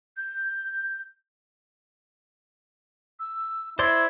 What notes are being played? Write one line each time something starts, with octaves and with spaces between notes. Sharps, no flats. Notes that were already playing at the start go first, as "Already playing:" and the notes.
G6
E6
E4 C5 D5 C6 G#6